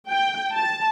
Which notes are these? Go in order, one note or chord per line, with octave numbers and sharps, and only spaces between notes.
G5
A5